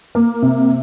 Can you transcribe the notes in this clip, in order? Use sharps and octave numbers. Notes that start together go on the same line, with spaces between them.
A#3
C3